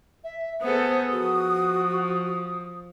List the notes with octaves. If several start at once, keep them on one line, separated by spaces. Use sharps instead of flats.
E5
B3 G#4 A4 C5 D#6
F3 F#4